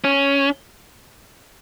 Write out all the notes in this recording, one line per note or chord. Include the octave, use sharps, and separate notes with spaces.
C#4